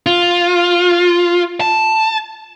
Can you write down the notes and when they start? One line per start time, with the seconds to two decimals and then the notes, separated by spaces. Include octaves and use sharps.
0.06 F4
1.60 A5